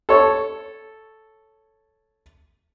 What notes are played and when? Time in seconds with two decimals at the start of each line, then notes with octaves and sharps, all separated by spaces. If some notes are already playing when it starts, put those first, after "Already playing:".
0.09 A4 C#5